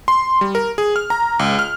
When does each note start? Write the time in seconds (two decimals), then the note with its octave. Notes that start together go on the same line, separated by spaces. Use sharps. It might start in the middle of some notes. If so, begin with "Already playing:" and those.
0.08 C6
0.41 G3
0.55 A#4
0.78 G#4
0.96 F6
1.10 A#5
1.39 C#2
1.59 F6